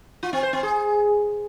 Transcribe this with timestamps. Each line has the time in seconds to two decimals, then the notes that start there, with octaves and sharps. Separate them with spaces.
0.23 F4
0.33 C4
0.43 C5
0.53 C4
0.63 G#4